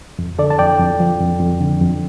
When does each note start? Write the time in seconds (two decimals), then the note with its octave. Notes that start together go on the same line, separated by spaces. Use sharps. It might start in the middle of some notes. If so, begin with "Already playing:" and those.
0.19 F2
0.39 D3 A4 D5
0.50 A5
0.59 F2 D5 G5
0.79 F2
1.00 F3
1.20 F2
1.40 F2
1.61 D3
1.81 F2